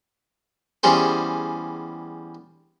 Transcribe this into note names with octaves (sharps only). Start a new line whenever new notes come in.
E2 G3 C#4 G#4 C5